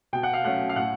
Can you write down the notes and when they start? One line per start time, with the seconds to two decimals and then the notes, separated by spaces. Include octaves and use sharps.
0.13 B2 G5
0.23 F#5
0.33 F5
0.44 F#3 A3 C#4 F#5
0.69 F5
0.76 A2 F#5